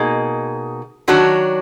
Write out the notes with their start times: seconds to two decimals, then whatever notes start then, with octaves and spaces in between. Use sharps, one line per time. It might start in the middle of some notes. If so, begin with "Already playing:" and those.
Already playing: B2 A#3 D#4 G#4
1.08 D#3 F#3 D4 F#4